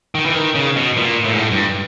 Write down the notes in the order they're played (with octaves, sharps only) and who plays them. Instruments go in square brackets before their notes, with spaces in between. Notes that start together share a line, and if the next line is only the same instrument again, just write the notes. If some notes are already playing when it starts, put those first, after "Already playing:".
[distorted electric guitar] D#3
E3
D#3
C#3
B2
A#2
A2
G#2
A2
G2